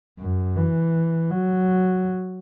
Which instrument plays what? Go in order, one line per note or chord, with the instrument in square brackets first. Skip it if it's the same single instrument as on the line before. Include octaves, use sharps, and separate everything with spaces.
[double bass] F#2
E3
F#3